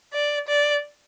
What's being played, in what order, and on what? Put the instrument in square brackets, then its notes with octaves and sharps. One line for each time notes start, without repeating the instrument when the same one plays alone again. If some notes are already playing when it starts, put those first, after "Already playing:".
[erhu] D5
D5